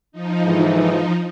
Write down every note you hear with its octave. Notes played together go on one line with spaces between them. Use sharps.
F3 D#4
G#2 D3 E3